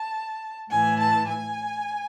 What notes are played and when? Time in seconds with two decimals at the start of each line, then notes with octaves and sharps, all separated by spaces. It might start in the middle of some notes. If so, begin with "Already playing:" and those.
Already playing: A5
0.71 A2 E3 G#5
0.99 A5
1.28 G#5